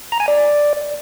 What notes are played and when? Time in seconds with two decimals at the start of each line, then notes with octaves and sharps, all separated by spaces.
0.12 A#5
0.20 G#5
0.28 D5